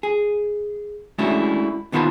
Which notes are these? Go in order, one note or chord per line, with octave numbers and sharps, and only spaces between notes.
G#4
G#3 A3 C#4 D4 E4 F#4
A#2 D#3 B3 F4 A5 B5